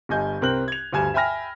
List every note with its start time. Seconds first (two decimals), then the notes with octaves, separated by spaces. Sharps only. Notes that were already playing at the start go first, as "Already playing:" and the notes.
0.09 G1 G2 D#5 G#5 G6
0.41 C2 C4 A#4 F#6 F#7
0.68 G#6 F7
0.93 D2 G2 G#5 G#6 E7
1.14 E5 G5 G#5 B5 F6 A#6